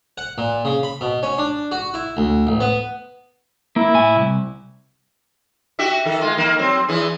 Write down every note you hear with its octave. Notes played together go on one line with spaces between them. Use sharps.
F#5
A#2
C#3
B5
B2
C#4
D4
F#4
E4
D2
A1
B3
A#3 E4
A2 G#5
C2
F#4 G4 E5
D#3 A4
G#3 F4
D#3 A#3
F#3 C4
E2 E3 G#4